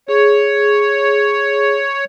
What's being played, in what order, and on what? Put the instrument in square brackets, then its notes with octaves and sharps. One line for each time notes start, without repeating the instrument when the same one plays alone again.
[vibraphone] G#4 [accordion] C#5